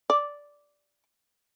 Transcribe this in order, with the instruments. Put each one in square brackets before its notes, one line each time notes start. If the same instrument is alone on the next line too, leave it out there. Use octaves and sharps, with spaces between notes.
[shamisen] D5